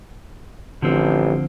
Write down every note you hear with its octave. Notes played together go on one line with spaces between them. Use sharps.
A1 D3 F3 C4